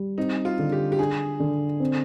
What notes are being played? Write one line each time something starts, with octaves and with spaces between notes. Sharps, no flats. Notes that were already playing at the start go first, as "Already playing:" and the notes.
Already playing: G3
C4 D#4
F4
D3
G4
G4
D4 G#4
D3
C4